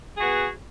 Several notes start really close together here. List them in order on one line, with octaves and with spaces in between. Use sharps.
G#4 F#4 B3